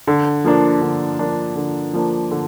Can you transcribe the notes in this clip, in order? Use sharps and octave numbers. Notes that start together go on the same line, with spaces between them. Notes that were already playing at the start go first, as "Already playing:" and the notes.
D3
F3 A#3 D4
D3
F3 A#3 D4
D3
F3 A#3 D4
D3